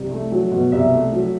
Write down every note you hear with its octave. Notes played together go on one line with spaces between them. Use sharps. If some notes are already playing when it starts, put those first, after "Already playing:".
Already playing: C2
A3
F#3
B2
C2 E5
A3
F#3